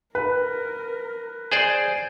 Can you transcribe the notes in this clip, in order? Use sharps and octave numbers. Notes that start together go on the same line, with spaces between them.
A#4 B4
G#4 C5 D5 G#5 G6